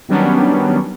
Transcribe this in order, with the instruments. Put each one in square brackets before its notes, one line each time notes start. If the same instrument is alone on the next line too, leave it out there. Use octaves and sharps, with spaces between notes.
[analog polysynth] D#3 F#3 G3 B3 C#4 D4